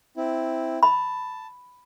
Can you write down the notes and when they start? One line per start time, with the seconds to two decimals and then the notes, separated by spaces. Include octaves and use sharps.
0.17 C4 E4
0.83 A5 B5